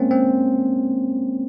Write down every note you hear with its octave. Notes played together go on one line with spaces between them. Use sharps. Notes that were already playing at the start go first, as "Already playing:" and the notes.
Already playing: G#3 A#3 C4 C#4
C4